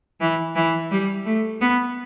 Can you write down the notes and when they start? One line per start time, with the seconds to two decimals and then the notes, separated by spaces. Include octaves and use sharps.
0.21 E3
0.55 E3
0.91 G3
1.26 A3
1.61 B3